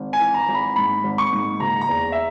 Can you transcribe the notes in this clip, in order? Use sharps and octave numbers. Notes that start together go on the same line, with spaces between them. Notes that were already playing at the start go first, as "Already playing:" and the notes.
Already playing: G#1
G#5
E3
A#5
G#1
B5
G#2 B5
G#1
C#6
G#2
F#1 A#5
A#5
E2
E5